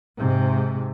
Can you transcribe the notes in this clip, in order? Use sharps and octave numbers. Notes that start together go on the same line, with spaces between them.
G#2 C3